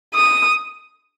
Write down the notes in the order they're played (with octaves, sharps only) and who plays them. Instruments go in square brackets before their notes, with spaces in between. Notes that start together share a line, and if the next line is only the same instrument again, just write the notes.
[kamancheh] D#6